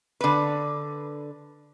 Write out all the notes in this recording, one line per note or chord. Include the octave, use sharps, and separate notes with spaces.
D3 B4